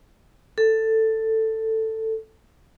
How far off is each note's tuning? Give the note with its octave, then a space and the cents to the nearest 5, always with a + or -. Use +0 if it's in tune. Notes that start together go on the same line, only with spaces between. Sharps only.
A4 +10